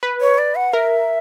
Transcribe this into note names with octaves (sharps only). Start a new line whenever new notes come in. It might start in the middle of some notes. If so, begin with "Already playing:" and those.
B4
C#5
D5
F#5
A#4 E5